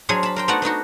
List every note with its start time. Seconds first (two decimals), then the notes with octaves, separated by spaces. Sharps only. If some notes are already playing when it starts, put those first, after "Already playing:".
0.09 F#3 D4 G#4 C5 C#5 F5
0.23 A5 B5
0.36 A#4 C5 G5
0.48 A3 B3 D#4 F#4 D5 F#5
0.62 B3 D4 D#4 F#4